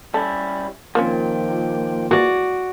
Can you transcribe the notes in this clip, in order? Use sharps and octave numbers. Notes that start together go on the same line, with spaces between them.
G3 C#4 E4 A4
A#2 D#3 F3 A#3 C4 C#4 G5
E3 G#3 A#3 F#4 D5